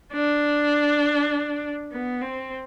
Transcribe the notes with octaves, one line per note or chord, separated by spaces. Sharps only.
D4
B3
C4